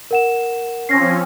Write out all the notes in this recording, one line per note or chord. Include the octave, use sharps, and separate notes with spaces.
A#4 F#5 E7
F3 C4 C#4 A#6 C7